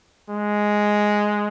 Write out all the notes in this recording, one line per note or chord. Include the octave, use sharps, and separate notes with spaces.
G#3